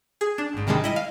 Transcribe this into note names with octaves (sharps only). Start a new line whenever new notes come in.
G#4
D4
G#1 G#2
C3 D#3 G3 G#3 D4
E4 D#5 D#7
F5